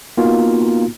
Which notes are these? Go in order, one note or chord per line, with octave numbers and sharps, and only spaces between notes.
A#3 B3 D#4 F4 F#4